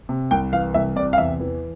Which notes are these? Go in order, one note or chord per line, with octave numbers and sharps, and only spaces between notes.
C3
C2 G5
E3 F5
C2 E5
C3 D5
F5
E2 E5
E3